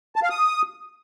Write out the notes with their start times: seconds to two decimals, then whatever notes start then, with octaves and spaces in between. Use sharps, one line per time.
0.16 A5
0.23 F5
0.30 D#6